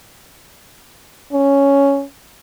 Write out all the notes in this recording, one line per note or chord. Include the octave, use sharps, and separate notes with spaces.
C#4